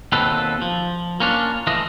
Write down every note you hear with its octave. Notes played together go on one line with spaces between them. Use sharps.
D#2 B2 C4 A4 B4
F3
A#3 C#4 D4 F4
E3 A3 F4 D#5